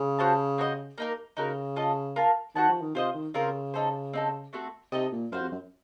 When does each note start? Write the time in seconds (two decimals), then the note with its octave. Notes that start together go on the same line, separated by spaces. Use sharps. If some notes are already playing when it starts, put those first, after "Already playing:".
Already playing: C#3
0.19 F#4 C5 F5 A5
0.58 C4 F#4 C5 D#5
0.98 A#3 D#4 A#4
1.37 C#3 D#4 F#4 A#4
1.76 F4 A4 D#5
2.16 F4 A#4 F5 A5
2.55 D#3 F#4 C5 F#5 A5
2.69 F3
2.81 D#3
2.95 C3 F4 C5 D#5
3.14 D#3
3.34 C#3 C4 F4 A#4
3.74 D#4 A4 C5
4.13 C4 D#4 A4
4.53 A3 C4 F#4 A4
4.92 C3 D#4 A4 D#5
5.13 A#2
5.32 F#2 F#4 C5 F5
5.41 F2
5.51 F#2